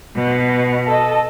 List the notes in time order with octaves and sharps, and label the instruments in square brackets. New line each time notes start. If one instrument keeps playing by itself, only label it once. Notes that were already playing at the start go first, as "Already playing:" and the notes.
[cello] B2
[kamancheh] A4 D#5